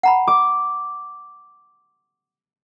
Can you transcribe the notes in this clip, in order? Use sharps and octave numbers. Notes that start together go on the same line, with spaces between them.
F#5 A#5 B5
D6